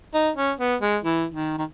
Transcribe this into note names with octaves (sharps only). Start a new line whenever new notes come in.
D#4
C#4
B3
G#3
E3
D#3
D#3